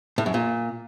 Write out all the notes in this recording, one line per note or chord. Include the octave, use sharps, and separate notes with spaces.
A2
F#2
A#2